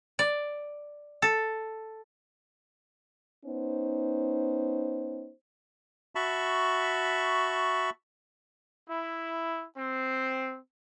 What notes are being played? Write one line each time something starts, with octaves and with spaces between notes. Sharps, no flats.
D5
A4
B3 C#4 D#4 C5
F#4 E5 A5 B5 C#6
E4
C4